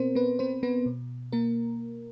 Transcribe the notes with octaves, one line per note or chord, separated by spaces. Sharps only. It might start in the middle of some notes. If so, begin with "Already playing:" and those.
Already playing: B2 B3 C4 A#4 C5
B3 B4
C4 C5
B3 B4
B2
A#3 A#4